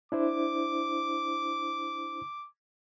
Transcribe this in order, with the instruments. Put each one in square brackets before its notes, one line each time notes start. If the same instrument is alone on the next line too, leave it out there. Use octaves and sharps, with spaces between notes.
[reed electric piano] D4 E4 C5 [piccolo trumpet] D6